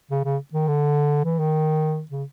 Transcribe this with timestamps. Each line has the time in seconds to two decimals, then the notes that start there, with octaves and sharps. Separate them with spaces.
0.11 C#3
0.24 C#3
0.53 D#3
0.68 D3
1.24 E3
1.39 D#3
2.11 C#3